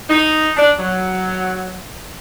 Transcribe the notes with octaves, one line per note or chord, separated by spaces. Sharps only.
D#4
D4
F#3